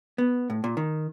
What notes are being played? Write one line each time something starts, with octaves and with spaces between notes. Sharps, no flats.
B3
A2
A#2
D#3